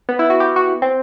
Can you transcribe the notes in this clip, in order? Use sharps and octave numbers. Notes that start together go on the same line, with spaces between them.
B3
E4
F#4
G4
F#4
C4